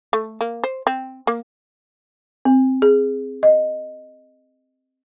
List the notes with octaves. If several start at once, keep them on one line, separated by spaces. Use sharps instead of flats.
A3
A#3
C5
C4
A#3
C4
G#4
D#5